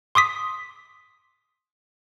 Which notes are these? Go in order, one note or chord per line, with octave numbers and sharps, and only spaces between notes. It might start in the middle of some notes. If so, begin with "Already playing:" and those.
C6 D6 D#6 B6